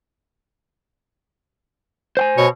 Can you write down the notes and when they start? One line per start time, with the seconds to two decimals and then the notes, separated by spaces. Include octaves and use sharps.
2.17 C5 G5 G#5
2.38 B2 C#5